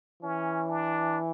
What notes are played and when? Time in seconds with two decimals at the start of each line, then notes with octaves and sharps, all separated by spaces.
0.23 E3 C#4
0.70 D4